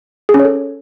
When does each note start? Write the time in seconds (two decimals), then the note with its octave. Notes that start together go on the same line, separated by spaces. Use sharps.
0.29 G#4
0.34 C#4
0.40 C#5
0.45 A4